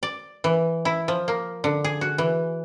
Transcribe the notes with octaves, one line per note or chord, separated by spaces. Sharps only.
D5
E3
E4
F3
A#3
D3
G#4
F#4
E3